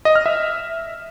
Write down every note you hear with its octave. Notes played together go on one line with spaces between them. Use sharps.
D#5
F6
E5